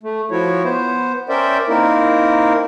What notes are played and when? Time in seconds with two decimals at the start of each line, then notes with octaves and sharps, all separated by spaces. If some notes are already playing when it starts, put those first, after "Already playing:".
0.03 A3
0.31 F3 E4 F#4 C#5
0.64 B3 C5
1.29 C#4 A#4 C5 D5 E5 G5
1.68 A#3 C4 D#4 E4 A#4